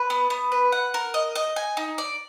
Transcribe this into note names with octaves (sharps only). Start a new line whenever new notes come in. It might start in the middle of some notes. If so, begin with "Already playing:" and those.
Already playing: B4
B3
B3
B4
F#5
A#4
D#5
D#5
G#5
D#4
D5